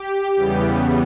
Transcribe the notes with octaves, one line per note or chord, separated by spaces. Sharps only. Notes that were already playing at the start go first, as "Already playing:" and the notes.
Already playing: G4
E2 C#3 E3 G3 B3